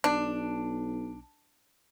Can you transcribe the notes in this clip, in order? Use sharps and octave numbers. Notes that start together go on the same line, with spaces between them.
B1 D4